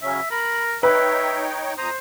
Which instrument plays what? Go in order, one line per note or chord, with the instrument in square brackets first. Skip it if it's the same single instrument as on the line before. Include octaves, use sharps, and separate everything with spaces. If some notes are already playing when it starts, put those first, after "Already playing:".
[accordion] C#3 F#3 C#4 [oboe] E5
[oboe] A#4 [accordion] B5
[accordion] D#4 C#5 G5 [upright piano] B4 [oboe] E5
[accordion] F2 A#5 D#6 [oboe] C5